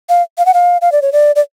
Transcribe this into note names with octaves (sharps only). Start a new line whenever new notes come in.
F5
F5
F#5
F5
F5
D5
C#5
D5
D5